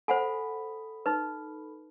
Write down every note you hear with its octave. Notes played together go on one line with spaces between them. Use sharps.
A4 C5 F#5 G#5 B5
D#4 B4